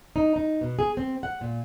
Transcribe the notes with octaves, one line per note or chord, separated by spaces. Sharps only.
D#4
D#4
B2
G#4
C4
F#5
A#2